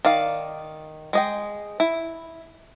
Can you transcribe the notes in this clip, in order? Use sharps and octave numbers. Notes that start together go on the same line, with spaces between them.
D#3 D5 F5
G#3 D#5 G5
E4